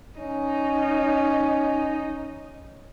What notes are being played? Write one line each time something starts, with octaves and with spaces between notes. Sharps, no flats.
C#4 D#4